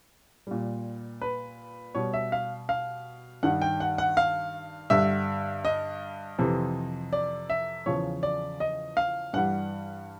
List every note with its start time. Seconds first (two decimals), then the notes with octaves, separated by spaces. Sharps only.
0.47 A#2 G3
1.22 B4
1.95 B2 G3 C#5
2.14 E5
2.32 F5
2.69 F5
3.43 G2 D#3 G3 F#5
3.62 G5
3.80 F#5
3.98 F#5
4.17 F5
4.90 G2 D3 G3 E5
5.65 D#5
6.39 F2 C3 E3
7.13 D5
7.50 E5
7.86 E2 C#3 F3 C#5
8.23 D5
8.60 D#5
8.97 F5
9.33 G2 E3 G3 F#5